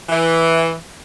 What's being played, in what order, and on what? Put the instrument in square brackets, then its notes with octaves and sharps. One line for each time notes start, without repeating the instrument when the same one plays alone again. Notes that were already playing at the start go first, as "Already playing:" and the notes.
[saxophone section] E3